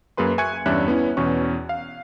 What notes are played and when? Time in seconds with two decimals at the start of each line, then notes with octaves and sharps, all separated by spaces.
0.17 F#2 A#3 G#4 B4 C6
0.38 E5 G#5 C#6 F#6 G#6 C#7
0.66 E2 G2 C#4 D5 E5 F#6
0.88 B3 C#4 E4
1.17 E2 B2 C#4 C#6
1.69 F5